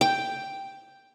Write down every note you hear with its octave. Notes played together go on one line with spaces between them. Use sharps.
G5